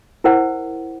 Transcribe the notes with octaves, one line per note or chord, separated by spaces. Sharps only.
E4 A#4 C5 F#5